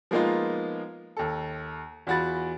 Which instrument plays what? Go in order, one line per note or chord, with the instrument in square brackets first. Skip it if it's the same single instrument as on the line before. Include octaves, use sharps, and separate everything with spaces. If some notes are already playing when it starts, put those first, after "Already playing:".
[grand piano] F3 G#3 A#3 B3 D#4 F4
D#2 A4
E2 F4 F#4 B5 A6